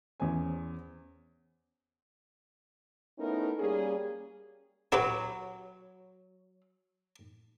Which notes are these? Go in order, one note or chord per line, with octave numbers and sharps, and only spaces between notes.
E2 C#4 C5 G#5
A3 B3 C#4 D#4 E4 A#4
G3 A#3 C#4 G#4
F#3 E4 G4 B4